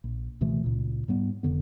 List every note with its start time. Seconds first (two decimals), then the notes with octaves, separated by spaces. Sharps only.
0.04 A#1
0.41 C#2 B2 E3 A3
0.64 C#2 A#2
1.08 G#2 G3 B3
1.43 F1 F2 D3 B3